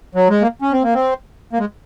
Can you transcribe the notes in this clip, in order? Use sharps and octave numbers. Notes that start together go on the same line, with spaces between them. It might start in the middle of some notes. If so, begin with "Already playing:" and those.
F#3
G#3
A#3
C#4
C4
A#3
C4
A#3
G#3